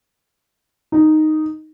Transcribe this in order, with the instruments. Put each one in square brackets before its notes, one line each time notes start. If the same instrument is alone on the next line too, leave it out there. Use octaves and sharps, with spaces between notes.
[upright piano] D#4